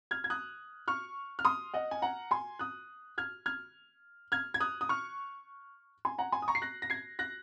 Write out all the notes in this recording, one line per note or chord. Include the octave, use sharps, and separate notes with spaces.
F6 G#6
G#6
D#6 F#6
C#6 F6
F6
C6 D#6
D#5 F#5
G#5
F#5 A#5
G#5 C6
D#6 F#6
F6 G#6
F6 G#6
F6 G#6
G#6
D#6 F#6
D#6
C#6 F6
G#5 C6
F#5 A#5
G#5 C6
D#6
A#5 C#6
C7
F#6 A#6
A#6
G#6 C7
F#6 A#6